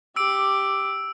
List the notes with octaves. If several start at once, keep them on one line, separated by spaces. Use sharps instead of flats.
G4 D6 E6 D7